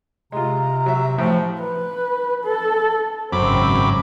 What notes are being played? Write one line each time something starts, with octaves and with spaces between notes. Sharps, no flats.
C3 G#3 F4 A#5
F#3 E5
A2 F3
B4
A4
G#1 F#2 C#3 C4 B5 D6